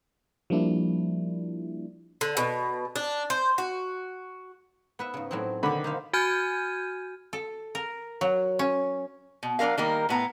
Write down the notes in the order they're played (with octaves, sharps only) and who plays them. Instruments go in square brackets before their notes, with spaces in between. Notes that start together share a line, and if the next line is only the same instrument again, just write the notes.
[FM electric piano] F3 G3 A#3 D4 E4
[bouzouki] D3
B2
D4
C5
F#4
[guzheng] B3 B4 E5
G#2 C#3
A2 F#3 C4
[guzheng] B2 D#3 [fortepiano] D3 B5
[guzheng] D#4 C5 F5
[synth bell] F#4 G#5 F6 G6 G#6 D#7
[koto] A4
A#4
F#3
C#4
[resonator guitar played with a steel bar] B2
F#3 D4 F4 A#4 F5
D#3 G3 A#3 D#4 A#4
A2 B3 A#5